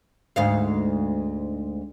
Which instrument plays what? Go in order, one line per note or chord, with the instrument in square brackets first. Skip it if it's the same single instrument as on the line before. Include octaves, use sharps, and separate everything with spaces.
[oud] D2 G#2 F5